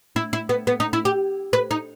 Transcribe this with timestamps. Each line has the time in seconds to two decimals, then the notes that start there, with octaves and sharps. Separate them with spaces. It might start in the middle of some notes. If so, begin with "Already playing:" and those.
0.16 E4
0.33 E4
0.49 B3
0.67 B3
0.80 D#4
0.93 E4
1.05 G4
1.53 B4
1.71 D#4